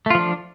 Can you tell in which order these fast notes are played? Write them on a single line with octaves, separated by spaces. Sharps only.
A3 F4 F3 D4